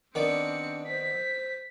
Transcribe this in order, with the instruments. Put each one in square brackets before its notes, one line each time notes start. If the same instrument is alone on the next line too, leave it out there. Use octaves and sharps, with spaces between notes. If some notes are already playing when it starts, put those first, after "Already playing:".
[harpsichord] D#3 B3 D5 [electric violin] C4 C#7 [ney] D4 [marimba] A#4
[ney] C5 [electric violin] B6